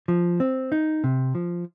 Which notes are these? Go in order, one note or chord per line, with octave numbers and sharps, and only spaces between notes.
F3
C4
D#4
C3
F3